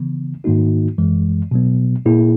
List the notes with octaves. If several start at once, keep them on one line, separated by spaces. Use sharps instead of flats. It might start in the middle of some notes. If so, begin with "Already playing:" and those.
Already playing: C#3 E3 B3
G#2 D#3 A#3 D#4 F#4
F#2 E3 G#3
B2 F#3 B3
A#2 A#3 E4 G#4